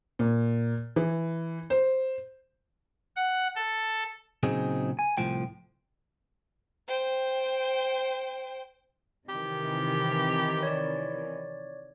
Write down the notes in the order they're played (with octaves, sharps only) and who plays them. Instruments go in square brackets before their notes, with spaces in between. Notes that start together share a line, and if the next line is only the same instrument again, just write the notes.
[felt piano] A#2
E3
C5
[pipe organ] F#5
A4
[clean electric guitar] A#2 C#3 F#3 C4 D#4 G#4
G#5
C2 A2 F3 G5
[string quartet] C5 G5
[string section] C3 D#3 E3 [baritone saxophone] G4
[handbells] C#5 D5